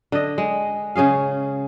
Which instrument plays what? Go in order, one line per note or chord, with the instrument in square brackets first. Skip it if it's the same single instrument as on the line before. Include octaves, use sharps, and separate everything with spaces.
[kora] D3 D#5
G#3
C#3 C#4 G#4 F5